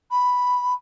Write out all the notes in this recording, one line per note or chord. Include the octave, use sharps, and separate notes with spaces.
B5